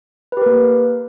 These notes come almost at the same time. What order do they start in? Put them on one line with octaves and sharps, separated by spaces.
B4 G4 A#4 A#3